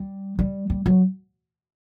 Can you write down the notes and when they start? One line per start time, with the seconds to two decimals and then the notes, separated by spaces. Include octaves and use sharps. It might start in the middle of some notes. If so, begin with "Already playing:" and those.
Already playing: G3
0.39 G3
0.70 G3
0.86 F#3